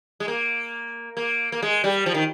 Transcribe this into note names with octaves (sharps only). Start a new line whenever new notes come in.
G#3
A#3
A#3
A#3
G#3
G3
F3
D#3